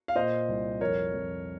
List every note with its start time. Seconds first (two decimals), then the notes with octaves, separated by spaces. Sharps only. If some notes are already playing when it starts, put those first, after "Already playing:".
0.08 F5
0.15 A#2 C5 D#5
0.48 C2
0.81 F2 A#4 C#5
1.13 F2